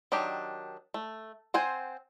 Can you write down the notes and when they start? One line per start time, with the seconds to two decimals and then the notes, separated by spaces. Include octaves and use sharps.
0.12 D#3 F#3 D4 G4
0.94 A3
1.54 C4 C5 F#5 G#5